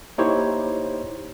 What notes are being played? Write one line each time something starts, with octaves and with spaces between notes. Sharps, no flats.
A#3 D#4 E4 G4 C5 C#5